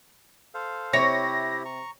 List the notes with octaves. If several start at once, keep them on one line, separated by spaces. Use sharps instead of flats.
A4 C5 F5
C3 E4 G4 C#5 A#6
A#5 C#6